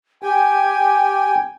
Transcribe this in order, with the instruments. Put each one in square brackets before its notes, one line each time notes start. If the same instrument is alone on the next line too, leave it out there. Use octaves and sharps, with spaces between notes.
[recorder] G4 [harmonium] G5 G#5